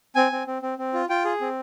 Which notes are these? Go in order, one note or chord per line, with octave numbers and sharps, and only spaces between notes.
C4 G#5
C4
C4
C4
C4
F4
F4 G5
G#4
C4